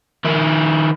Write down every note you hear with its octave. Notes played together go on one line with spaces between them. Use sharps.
D#3 E4